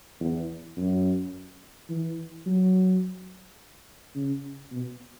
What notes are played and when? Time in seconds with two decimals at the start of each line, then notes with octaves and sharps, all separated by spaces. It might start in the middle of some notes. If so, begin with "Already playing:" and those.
0.20 E2
0.77 F#2
1.89 E3
2.46 F#3
4.15 C#3
4.72 B2